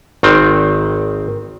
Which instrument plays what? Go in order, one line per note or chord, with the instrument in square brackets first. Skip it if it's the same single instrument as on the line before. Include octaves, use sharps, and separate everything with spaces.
[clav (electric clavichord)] G#1 D#3 C4